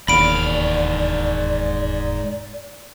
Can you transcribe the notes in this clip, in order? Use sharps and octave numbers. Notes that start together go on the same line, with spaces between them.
E1 D#2 G#2 D5 F5 B5 D7